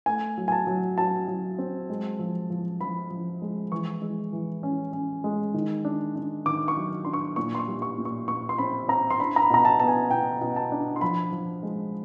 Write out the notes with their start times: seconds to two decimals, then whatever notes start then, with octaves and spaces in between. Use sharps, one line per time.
0.06 A3 G#5
0.38 F#3
0.48 G#5
0.52 A5
0.67 F#3
0.98 F#3 A5
1.28 F#3
1.58 C4
1.90 G#3
2.19 F3
2.50 F3
2.81 F3 B5
3.11 F3
3.42 G#3
3.72 E3 C#6
4.02 G#3
4.33 E3
4.63 C#4
4.93 C#4
5.24 G#3
5.54 D#3
5.85 D4
6.16 D4
6.46 D#3 D6
6.68 C#6
6.76 F#3
7.05 D4 C6
7.13 C#6
7.36 A#2 C#6
7.55 C6
7.59 C#6
7.67 G3
7.82 C#6
7.98 A#2
8.05 C#6
8.28 A#2 C#6
8.49 C6
8.58 C4 B5
8.88 C4 A#5
9.10 C6
9.20 D4 B5
9.36 A#5
9.42 B5
9.50 B2 A#5
9.65 A5
9.80 B3 A5
9.88 G#5
10.11 B2 G5
10.41 B2
10.56 A5
10.72 D4
10.96 C6
11.01 F3 B5
11.32 F3
11.63 G#3